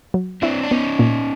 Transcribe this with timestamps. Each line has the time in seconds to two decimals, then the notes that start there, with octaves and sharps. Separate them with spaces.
0.14 F#3
0.42 C4 D4 E4
0.64 D4
0.71 B3 C#4 D#4
0.99 A#2